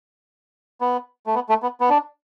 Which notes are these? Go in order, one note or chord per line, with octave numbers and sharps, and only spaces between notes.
B3
A3
B3
A3
B3
B3
D4